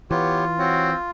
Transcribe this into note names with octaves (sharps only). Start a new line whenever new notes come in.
E3 B3 F4 G4 C#5
C4 F#4 C#5